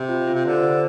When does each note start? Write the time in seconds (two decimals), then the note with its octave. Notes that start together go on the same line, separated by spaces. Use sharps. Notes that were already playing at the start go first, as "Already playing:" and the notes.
Already playing: C3
0.09 F4
0.28 F4
0.34 C3
0.45 D3 C5
0.63 C5